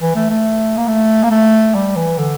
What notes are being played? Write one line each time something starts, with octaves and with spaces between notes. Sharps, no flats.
E3
A3
A3
A#3
A3
A#3
A3
G3
E3
D3